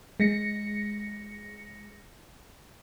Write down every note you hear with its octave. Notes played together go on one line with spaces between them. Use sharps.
G#3 A#6 C#7